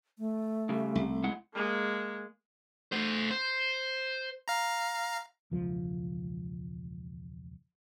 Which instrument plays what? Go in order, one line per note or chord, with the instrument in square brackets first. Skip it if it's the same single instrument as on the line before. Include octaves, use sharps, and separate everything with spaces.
[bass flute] A3
[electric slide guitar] C#3 G3
[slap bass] C2
[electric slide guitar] G#3 E4 F#5
[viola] G#3 A#3
[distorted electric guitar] A3 C5
C5
[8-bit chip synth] F5 A#5
[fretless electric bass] E1 C#2 F3